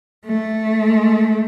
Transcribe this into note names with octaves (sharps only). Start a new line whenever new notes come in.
A3